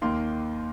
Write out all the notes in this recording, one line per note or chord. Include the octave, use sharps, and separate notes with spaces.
D#2 D#3 A#3 C6